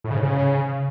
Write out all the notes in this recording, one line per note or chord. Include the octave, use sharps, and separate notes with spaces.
A2
C#3
G#2
C#3